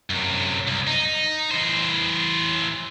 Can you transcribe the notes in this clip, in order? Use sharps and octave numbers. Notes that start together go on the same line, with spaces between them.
F#2 C3
C2
D#4
E3 C5